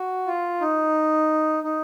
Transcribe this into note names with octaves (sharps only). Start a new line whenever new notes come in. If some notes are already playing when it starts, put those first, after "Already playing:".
Already playing: F#4
F4
D#4
D#4